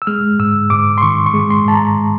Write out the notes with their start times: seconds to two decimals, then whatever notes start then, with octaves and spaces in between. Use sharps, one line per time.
0.02 E6
0.07 G#3 F6
0.39 G#2 E6
0.70 G#2 D6
0.98 C6
1.02 D#3 C#6
1.26 C#6
1.34 G#3
1.50 C6
1.66 G#2 A5
1.74 A#5